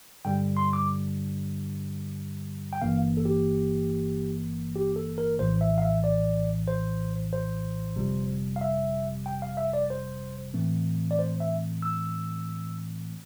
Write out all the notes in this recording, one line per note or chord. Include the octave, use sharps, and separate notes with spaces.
G2 D3 G3 G5
C6
D6
G5
G1 G2 E3 A#3 F5
A4
G4
G4
A4
A#4
A#1 A2 E3 C5
E5
F5
E5
D5
C5
C5
G1 F2 C3 G3
F5
E5
G5
F5
E5
D5
C5
A2 E3 A3 C4
D5
C5
E5
E6